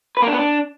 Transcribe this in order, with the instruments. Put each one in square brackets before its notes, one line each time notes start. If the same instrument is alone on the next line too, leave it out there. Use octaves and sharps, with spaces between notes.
[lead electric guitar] B4
A#3
D4
B3
D4